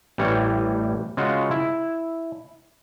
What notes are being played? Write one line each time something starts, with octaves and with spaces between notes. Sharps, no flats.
A1 E3 G3 C#5
C#3 G#3 F4 F#4
E4